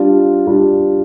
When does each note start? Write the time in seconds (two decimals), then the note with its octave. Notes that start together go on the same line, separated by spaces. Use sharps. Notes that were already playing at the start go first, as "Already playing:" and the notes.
Already playing: G3 D4 F4
0.47 G3 D4 F4